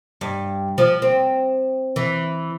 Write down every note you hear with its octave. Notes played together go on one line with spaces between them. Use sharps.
G2
F3
C4
E3